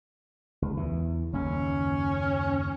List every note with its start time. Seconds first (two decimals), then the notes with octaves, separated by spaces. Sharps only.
0.62 C#2
0.77 E2 E3
1.33 F#1 D#2 C#4